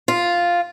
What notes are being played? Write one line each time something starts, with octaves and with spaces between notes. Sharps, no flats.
F4